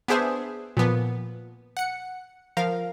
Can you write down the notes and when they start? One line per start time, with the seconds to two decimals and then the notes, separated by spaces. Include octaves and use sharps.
0.08 B3 D4 G#4 C5 E5
0.77 A#2 F3 B3
1.77 F#5 C#7
2.57 F3 A#4 F5